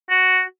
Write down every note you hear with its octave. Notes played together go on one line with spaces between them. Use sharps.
F#4